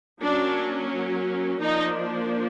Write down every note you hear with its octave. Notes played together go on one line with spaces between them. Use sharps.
F#3 A#3 C#4 D4
F3 A#3 D4 D#4